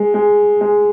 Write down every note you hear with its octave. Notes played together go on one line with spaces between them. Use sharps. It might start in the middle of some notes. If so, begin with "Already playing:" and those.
Already playing: G#3
G#3
G#3